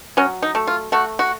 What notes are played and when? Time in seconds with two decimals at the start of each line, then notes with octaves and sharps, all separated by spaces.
0.17 F#3 C#4
0.42 D#4
0.55 A3
0.67 F4
0.92 A3 F#4
1.19 F#4